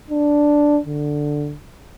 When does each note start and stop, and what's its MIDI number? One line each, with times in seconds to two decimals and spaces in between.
0.10 0.79 62
0.86 1.54 50